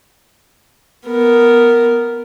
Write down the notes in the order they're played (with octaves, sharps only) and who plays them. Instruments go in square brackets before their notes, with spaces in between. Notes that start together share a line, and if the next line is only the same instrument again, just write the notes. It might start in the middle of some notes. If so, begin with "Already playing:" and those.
[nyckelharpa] B3 A#4